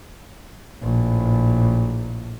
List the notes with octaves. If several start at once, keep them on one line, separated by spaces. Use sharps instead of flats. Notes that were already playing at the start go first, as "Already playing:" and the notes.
A#1 A2